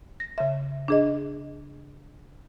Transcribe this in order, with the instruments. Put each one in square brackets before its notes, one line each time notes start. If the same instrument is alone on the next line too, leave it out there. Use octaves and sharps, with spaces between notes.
[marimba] A#6
C#3 E5
D4 G#4 D#5